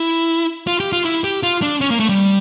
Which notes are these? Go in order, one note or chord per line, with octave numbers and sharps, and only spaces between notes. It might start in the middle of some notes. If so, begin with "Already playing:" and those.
Already playing: E4
F4
G4
F4
E4
G4
F4
D4
C#4
A#3
A3
G3